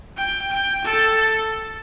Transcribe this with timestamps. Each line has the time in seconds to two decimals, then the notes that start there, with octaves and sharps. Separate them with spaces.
0.17 G5
0.51 G5
0.85 A4